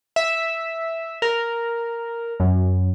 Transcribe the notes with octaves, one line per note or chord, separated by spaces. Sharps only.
E5
A#4
F#2